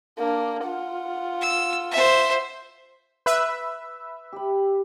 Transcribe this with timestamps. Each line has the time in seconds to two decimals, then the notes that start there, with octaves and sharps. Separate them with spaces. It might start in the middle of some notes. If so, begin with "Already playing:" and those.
0.19 A#3 D4
0.65 F4 F#5
1.41 E6
1.91 C5 E5
3.26 B4 E5
4.33 G4 B5